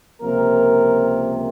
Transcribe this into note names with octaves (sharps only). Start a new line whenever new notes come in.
C#2 C3 F3 A#3 A#4